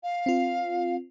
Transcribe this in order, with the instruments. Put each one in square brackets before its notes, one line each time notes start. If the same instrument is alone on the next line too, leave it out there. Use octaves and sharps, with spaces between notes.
[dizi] F5
[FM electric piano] C4 F4